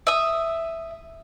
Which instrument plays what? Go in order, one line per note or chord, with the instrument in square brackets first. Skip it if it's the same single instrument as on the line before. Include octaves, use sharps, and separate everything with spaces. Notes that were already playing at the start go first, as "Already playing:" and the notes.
[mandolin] E5 D#6